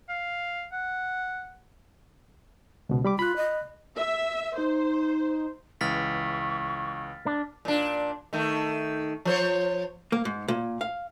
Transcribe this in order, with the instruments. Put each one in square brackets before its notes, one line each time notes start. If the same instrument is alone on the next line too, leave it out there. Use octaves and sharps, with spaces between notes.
[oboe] F5
F#5
[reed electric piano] C#2 B2
G3 B5 D6
[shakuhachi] F4 [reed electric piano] B5 F#6
[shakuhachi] D#5
[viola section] E5
[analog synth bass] D#4 [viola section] C5
[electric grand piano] C#2 E3 [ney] C#6 [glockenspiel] F6 A6 B6
[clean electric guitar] D4
[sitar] A#2 D4
D#3 A3
F3 C5 C#5
[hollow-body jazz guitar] A#3
G#2
A#2
F5